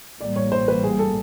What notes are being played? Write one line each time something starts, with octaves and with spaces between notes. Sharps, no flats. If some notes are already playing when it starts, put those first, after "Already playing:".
A1 A2 E3 G3 A#3 D5
C#5
C5
B4
G#4
A4